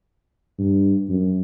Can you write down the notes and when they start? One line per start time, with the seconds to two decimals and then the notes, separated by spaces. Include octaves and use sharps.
0.59 G2
1.09 F#2